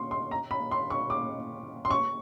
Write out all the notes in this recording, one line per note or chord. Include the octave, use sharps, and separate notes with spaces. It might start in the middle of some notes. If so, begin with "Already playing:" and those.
Already playing: C6 C#6
C6
A#5
B5
C6
C#6
D6
C6
C#6